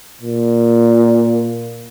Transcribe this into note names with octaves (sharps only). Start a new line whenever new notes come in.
A#2